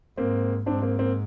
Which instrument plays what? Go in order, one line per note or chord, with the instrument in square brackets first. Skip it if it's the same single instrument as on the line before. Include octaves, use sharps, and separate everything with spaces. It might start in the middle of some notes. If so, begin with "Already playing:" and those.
[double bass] G#2 [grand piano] A#3 C4
[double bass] G#2 [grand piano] C4 D4
[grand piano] A#3 C4
A#3 C4